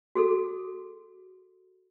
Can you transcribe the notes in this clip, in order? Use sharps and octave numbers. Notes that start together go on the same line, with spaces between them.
F#4 G#4 A4